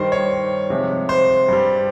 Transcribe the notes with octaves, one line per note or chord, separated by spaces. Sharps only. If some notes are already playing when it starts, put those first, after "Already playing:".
Already playing: G2 D#3 G3 C5
C#5
C3 F3 G#3
C5
G2 G3